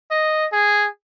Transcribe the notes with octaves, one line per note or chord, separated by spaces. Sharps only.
D#5
G#4